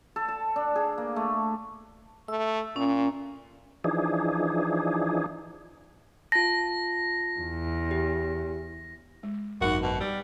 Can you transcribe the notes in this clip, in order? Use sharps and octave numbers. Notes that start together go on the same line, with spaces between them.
A4
A5
D4
G#4
A#3
A3
A3 E6
A#2 C#4
E3 F3 D4 D#4 G#4
F4 A5 A#6
E2
G4
G#3
G#1 F#2 D#4 F#4 A#4
B2
G3 G4